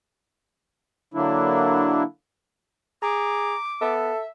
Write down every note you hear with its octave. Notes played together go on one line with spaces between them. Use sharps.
D3 F#3 A#3 D4 E4
G#4 A#5 D6
B3 A4 E5